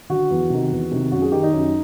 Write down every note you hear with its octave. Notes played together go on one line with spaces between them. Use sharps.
D3 F#4
E2
C3 D#3
E2
C3 D#3
F#2 F#4
G#4
D#3 G4
D#4
F#2